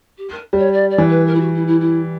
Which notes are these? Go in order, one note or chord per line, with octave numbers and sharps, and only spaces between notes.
G4
A#4
G3 C#5
D5
D5
E3
B4
A#4
E4
F#4
E4
E4
E4